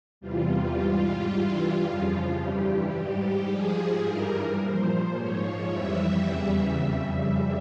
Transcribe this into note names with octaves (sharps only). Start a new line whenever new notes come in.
E2 C3 E3 G3 F4
G#2 G3
G2 E3 G3
F2 C#3 F3
G2 E3 G3 G4
G#2 G3
G#2 F3 G#4
G2 E3 G3 A#4
A#2 F3 C5
G#2 F3 C#5
F2 E3 G3 E5
E2 C#3 E3 G3
F2 C#3 G3